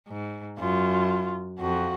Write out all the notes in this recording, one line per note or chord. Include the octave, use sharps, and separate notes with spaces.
G#2
F#2 F4
F2 F#4